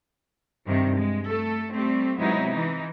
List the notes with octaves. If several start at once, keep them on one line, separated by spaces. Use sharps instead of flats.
G2 C3 D#3
G#3
A3 A4
G3 A3 C4
C3 F#3 G#3 B3 D#4 E4
E3 D#4